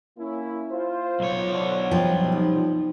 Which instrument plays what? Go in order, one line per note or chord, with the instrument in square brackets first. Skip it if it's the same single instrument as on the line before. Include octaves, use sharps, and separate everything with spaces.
[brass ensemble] A#3 C#4 E4
F4 C5
[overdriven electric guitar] B1 C#5
[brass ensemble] D3
[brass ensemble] C2 F#2 G3 [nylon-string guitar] F3 [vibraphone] G5
[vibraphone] D#4